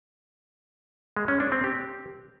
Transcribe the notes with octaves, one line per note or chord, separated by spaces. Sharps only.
G#3
C#4
D4
C4
G4